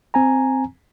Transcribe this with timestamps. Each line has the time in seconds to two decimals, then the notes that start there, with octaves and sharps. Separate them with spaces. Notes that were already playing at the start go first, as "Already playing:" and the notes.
0.14 C4 G#5 A#5